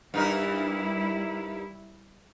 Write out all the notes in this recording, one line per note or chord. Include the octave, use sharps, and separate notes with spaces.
G2 G3 D#4 E4 A#4